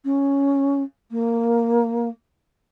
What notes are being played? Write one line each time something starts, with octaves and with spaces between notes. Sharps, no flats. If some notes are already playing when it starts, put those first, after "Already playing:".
C#4
A#3